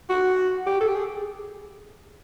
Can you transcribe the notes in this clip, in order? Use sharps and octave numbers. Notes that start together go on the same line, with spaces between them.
F#4
G4
A4
G4
G#4